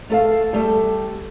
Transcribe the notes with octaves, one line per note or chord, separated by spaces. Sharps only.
A3 A4 F5
G3 A3 A4